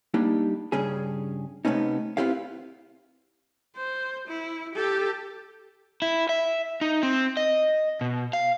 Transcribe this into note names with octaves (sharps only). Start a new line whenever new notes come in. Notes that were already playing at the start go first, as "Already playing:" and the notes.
G3 A#3 D4 D#4
G2 C#3 C#4 G#4
C3 E3 A3 B3 C#4 D#4
B3 C4 E4 G4 C#5 F5
C5
E4
G4 A4
E4
E5
D#4
C4
D#5
B2
F5